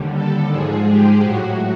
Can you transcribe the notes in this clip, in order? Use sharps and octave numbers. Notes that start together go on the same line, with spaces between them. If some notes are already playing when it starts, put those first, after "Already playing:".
Already playing: D#2 D3 G3
A4
G#2 F3 G#3 G#4
G4
A2 F#3 F#4